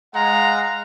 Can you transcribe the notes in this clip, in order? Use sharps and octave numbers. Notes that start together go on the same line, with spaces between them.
G#3 F5 F#5 A#5